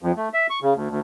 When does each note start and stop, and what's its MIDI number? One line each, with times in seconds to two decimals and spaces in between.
0.02 0.12 41
0.17 0.29 57
0.34 0.47 76
0.50 0.59 85
0.62 0.74 49
0.75 0.89 38
0.90 1.00 38